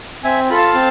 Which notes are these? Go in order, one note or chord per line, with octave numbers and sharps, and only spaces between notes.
C4 E5 G#5
F4 A4 B5
F5 A5
C4